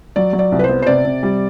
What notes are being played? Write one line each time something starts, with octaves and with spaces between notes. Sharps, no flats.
F#3 D5
F#3
D5
C2
B4
C5
B3
C5
C3 D5
C3
G3